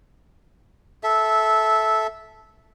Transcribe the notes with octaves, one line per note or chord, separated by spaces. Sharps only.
A4 E5